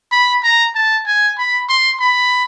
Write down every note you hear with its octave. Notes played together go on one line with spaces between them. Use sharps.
B5
A#5
A5
G#5
B5
C6
B5